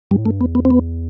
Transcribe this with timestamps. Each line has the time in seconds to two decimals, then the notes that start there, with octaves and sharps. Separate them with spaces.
0.11 G2 G3
0.18 A2
0.25 G2 A3
0.40 E2 B3
0.55 B3
0.65 C4
0.70 B3